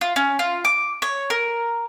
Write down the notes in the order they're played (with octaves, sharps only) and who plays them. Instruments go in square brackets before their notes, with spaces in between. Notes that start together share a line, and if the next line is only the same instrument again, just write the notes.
[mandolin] F4
C#4
F4
D6
C#5
A#4